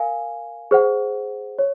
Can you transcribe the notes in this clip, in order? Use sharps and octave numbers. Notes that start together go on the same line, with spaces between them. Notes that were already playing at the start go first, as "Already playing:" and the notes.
Already playing: A#4 F5 G#5
G#4 C5 F#5
C#5